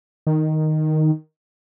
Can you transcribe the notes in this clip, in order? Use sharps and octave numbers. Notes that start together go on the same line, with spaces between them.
D#3